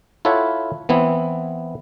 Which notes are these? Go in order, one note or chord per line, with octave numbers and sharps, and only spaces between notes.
E4 F4 A4 C#5 E5 F#5
E3 B3 C4 E4